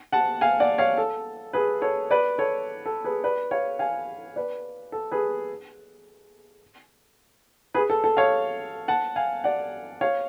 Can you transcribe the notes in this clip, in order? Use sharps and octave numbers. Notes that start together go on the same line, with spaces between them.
F#5 A5
F5 G#5
D5 F#5
C#5 F5
A4
G#4 B4
A4 C#5
B4 D5
A4 C#5
A4
G#4 B4
B4 D5
C#5 F5
F5 G#5
B4 D5
A4
G#4 B4
G#4 B4
A4
A4
C#5 F5
F#5 A5
F5 G#5
D5 F#5
C#5 F5